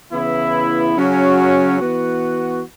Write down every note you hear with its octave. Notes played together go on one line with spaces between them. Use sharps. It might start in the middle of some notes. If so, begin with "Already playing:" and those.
C#3 E3 B3 E4
C#3 F#3 C#4 F#4
E3 B3 F#4